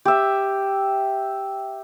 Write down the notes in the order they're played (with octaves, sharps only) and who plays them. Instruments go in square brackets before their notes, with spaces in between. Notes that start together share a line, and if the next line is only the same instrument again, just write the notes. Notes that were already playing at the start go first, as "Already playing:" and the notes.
[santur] G4 E5